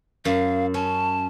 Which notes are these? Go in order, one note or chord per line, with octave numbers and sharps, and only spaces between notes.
F#2 F5
C#4 A5